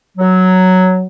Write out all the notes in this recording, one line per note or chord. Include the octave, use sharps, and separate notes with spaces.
F#3